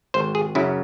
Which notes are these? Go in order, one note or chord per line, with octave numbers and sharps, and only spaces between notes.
G#1 C5
G#4
F#2 C#3 F#3 E4